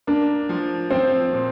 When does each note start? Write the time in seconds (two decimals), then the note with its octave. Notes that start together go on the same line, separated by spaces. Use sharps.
0.07 A#3 D4
0.49 F3
0.90 F3 C4
1.33 A#2